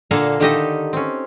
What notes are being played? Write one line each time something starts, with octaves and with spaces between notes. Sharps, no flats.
A#2 D3 A#3 A4 F5 G#5
D3 D#3 D#4 G4 A4 D#5
C4 C#4